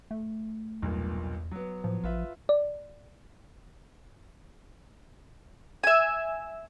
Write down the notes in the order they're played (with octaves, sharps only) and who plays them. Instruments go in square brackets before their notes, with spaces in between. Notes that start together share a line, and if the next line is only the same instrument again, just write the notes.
[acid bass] A3
[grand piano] B1 G2 A#2 [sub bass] E2
[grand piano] F#3 B3
[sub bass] A2 [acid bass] F3
[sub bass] A1 [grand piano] F4 B4 E5
[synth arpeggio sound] D5
[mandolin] E5 G#5